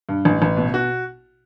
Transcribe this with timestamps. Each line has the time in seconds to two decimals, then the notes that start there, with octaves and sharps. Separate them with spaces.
0.09 G2
0.25 A1
0.42 A1
0.57 B2
0.74 F#4